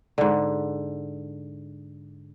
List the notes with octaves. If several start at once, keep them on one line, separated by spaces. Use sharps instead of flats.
G#2 D3